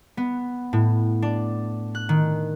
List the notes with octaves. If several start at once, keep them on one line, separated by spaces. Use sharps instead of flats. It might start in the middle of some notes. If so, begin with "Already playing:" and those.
B3
A2
D4
F#6
D#3